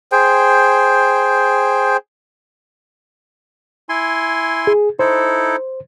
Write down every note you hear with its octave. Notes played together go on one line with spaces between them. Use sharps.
G#4 C5 G5
E4 G#5 C6
G#4
D#4 E4 A4 C5